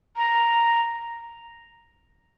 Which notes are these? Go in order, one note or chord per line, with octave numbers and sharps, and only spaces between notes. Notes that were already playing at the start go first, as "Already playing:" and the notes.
A#5